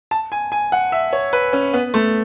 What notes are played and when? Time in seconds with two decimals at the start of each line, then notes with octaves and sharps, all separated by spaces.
0.11 A5
0.32 G#5
0.52 G#5
0.72 F#5
0.92 E5
1.13 C#5
1.33 B4
1.53 C#4
1.74 B3
1.94 A3